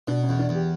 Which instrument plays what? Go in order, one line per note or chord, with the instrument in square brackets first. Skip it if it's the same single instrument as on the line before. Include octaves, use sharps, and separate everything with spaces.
[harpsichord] B2 [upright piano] D4
[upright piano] C#4
[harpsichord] E2
[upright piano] D4
[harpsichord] E2
[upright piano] G4